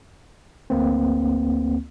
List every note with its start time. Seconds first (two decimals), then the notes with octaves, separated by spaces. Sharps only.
0.70 D2 A#3 C4